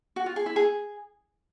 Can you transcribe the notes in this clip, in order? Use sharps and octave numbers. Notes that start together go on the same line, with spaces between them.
F#4
F4
G#4
E4
G#4